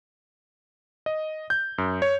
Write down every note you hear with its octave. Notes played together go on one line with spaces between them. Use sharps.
D#5
G6
F#2
C#5